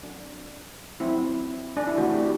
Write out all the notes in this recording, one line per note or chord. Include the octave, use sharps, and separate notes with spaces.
F#3 C4 D4
F#3 C4 E4
D4
E4
E3 A3 C4 D4 F#4
E4 G4